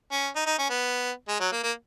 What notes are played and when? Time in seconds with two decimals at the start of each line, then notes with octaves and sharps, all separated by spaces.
0.11 C#4
0.35 D#4
0.46 D#4
0.59 C#4
0.70 B3
1.28 G#3
1.40 F#3
1.52 A#3
1.63 A#3